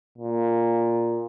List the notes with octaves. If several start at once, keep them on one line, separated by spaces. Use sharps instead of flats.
A#2